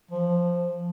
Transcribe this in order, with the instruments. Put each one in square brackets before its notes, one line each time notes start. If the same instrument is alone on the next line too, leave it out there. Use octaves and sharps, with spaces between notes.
[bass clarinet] F3